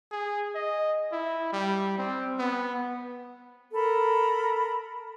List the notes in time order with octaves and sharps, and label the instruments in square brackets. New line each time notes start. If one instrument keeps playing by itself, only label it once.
[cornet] G#4
D#5
E4
G3
C4
B3
[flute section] A4 A#4 B5